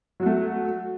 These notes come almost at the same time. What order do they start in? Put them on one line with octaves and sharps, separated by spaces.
F#3 F#4 A3